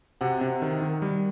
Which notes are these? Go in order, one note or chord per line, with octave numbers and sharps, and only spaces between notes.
C3 F#4 F#5
C3
D#3
D#3
G3